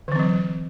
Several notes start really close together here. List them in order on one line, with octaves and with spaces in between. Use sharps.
D3 E3 C4 F#3